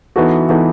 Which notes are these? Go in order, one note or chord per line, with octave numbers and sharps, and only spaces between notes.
E3 B3 D#4 F#4 A4
E3 B3 D#4 F#4 A4